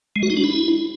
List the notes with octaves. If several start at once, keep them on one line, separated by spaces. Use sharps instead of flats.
G#3
F#4
D#4
D4
E4